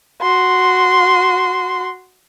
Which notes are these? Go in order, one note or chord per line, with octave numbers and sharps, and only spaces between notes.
F#4 C6